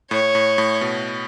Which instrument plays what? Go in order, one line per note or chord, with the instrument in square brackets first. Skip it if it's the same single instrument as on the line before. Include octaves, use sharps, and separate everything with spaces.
[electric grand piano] A2 [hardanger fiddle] C#5
[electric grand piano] A2
A2
B2